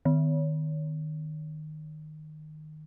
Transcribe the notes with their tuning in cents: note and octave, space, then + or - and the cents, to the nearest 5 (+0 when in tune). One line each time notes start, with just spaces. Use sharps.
D#3 -15